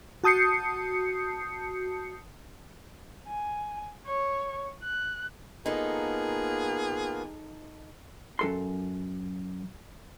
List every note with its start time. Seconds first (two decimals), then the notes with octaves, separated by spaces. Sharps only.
0.24 F#4 A5 D#6 G6 C7 C#7
3.27 G#5
4.06 C#5
4.83 F#6
5.66 A#3 B3 D#4 F4 G#4 A4
8.39 F#2 A4 C6